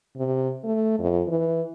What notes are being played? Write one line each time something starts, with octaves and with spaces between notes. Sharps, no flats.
C3
A3
F2
E3